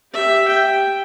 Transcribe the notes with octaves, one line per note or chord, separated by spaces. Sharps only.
G4 E5
G5